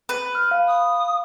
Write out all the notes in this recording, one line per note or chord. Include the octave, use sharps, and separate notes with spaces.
B4
F6
F5
D#6